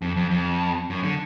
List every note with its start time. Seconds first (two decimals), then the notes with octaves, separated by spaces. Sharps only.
0.02 F2
0.16 F2
0.31 F2
0.90 F#2
1.03 D3